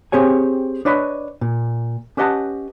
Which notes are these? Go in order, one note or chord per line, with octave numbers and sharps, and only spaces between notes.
C4 G4 G#4 C#5 G#5
D4 B4 C#5 D#5 B5
A#2
C#4 G4 B4 D#5 F#5 A5